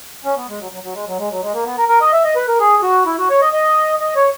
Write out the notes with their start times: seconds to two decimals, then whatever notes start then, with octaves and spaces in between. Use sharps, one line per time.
0.24 C#4
0.36 B3
0.49 G#3
0.59 F#3
0.72 F#3
0.83 F#3
0.94 G#3
1.07 F#3
1.18 G#3
1.30 F#3
1.42 G#3
1.54 A#3
1.65 B3
1.77 A#4
1.89 A#4
2.01 D#5
2.13 E5
2.24 D#5
2.36 B4
2.48 A#4
2.60 G#4
2.82 F#4
3.06 E4
3.18 F#4
3.30 C#5
3.42 D#5
3.53 D#5
4.00 D#5
4.16 C#5